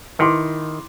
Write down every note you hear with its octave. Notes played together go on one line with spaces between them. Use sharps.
D#3 E4 C6 D6